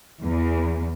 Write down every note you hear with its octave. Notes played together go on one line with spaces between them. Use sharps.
E2